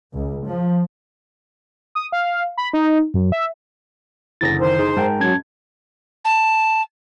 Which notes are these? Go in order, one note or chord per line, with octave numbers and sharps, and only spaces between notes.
C#2
F3
D#6
F5
B5
D#4
F#2
E5
F#1 D3 E3 A6 A#6
D#3 C5
D#4 G#4
G#2 G#4 A#4 G5 A5
F#3 C#4 A5 G#6
A5